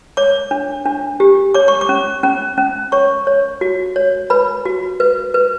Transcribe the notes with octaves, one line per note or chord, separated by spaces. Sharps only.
C#5 D6
D4
D4
G4
C#5 D6
C#6
D6
C#4
C#4
C#4
C#5 C#6
C#5
F#4
C#5
B4 B5
F#4
B4
B4